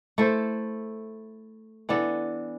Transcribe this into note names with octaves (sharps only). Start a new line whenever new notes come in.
A3 E4 A4 C5
E3 B3 D4 A4